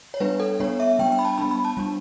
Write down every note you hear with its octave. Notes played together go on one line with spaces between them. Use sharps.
C#5
G3 B3 D4 B4
A4
G3 B3 D4 C#5
E5
G3 B3 D4 G5
G5
B5
A5
G3 B3 D4 B5
B5
A5
G3 D4